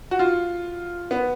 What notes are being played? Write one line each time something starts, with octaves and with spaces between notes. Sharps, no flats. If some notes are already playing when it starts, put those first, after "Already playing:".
F#4
F4
B3